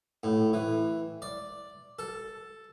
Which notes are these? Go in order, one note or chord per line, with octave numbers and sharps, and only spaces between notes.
A2
E3
D5
A4